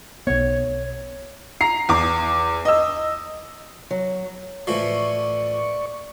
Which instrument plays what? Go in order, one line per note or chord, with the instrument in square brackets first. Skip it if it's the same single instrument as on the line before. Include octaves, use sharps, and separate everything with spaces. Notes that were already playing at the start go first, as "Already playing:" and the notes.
[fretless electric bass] B1 B3 [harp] C#5
[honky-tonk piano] A#5 C7
E2 D6
D#5 E6
[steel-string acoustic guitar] F#3
[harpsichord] A2 E3 F3 [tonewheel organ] D5 C#6